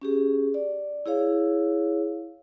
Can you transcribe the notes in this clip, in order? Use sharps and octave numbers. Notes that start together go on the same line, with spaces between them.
C#4 G4 G#4
D5
E4 G#4 C#5 F5